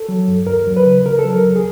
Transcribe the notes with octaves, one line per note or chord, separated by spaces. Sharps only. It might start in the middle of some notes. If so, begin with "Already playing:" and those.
Already playing: A4
F#3
G2
D#2 A#4
F#3
B4
C#3
C#3 A#4
A4
F#3
A#4
D#2
G#4